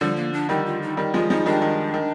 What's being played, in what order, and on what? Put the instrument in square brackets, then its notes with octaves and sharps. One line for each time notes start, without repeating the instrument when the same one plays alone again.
[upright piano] D3 F3 [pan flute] G3
[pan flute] A#3
D4
[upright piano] D#3 G3 [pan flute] D#4
[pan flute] F4
D#4
[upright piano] D#3 G3 [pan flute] D#4
[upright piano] F3 G#3 [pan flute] F4
[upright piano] F3 G#3 [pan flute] D#4
[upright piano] D#3 G3 [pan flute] D4
[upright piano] D#3
D#3